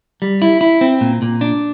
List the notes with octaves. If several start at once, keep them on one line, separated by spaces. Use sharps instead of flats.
G3
E4
E4
C4
A#2
A#2
D4